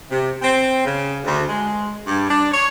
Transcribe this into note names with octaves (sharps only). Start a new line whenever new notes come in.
C3
C4
C#3
D2
G#3
G2
D4
C#5